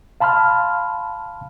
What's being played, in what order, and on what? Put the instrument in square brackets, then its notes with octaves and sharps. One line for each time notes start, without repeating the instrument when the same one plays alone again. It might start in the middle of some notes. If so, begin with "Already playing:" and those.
[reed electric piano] F5 A5 B5 C6 F6